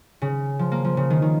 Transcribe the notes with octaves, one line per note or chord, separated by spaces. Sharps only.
C#3
F3
A#3
F3
C#3
D#3
D#3